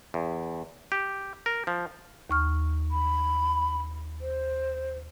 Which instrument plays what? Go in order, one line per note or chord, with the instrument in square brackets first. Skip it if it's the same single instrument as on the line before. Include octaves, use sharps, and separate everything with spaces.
[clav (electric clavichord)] E2
G4
A#4
F3
[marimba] D#2 C#6 F6
[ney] B5
C5